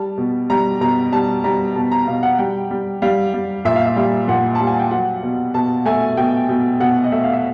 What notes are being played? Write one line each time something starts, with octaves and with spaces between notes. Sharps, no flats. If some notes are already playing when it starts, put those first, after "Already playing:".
Already playing: G3 A5
B2
G3 A#5
B2 A#5
G3 A5
G3 A#5
B2 A5
A#5
B2 F5
F#5
G3 G5
G3
G3 F5
G3
A#2 E5
F5
E5
G3 F5
A#2 F#5
G3 A5
G#5
G5
F#3 F#5
B2
B2 A5
A3 G#5
B2 G5
B2
B2 F#5
D#5
A3 E5
F5
E5